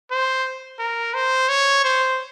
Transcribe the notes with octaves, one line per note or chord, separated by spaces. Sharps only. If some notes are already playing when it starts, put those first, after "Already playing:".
C5
A#4
C5
C#5
C5